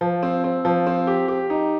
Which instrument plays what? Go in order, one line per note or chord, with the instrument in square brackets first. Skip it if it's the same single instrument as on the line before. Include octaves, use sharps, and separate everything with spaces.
[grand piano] F3
C4
C4
F3
C4
G4
G4
D#4